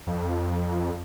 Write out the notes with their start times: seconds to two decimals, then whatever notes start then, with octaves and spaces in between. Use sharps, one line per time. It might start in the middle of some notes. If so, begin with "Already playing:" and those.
0.07 F2